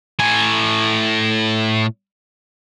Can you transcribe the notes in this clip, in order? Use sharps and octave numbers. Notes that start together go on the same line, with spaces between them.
A2 G#5